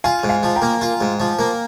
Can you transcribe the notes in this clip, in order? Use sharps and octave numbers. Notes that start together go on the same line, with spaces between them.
F4 F5 G#5
G#2
F5 G#5
F3
G5 A#5
A#3
F4
G#2
F3
A#3